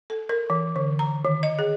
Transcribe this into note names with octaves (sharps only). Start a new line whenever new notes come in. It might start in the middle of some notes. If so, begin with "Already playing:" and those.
A4
A#4
E3
D3
A#5
D#3
D#5
G#4